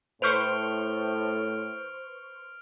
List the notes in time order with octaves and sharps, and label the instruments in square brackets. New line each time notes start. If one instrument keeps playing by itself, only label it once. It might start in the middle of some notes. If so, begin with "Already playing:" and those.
[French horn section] A2 [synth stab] B4 C5 C#6 [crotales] F6 D7 F7